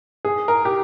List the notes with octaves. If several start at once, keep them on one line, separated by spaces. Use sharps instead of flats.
G#4
A#4
G4